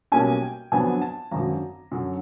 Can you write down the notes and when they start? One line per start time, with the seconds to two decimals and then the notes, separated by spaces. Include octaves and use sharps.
0.12 B1 B2 G3 A#3 C#4 G#5
0.42 G5
0.72 F2 D3 F#3 B3 D4 G#5
1.02 A5
1.31 G#1 F#2 D3 A#5
1.91 F#2 D3 F#3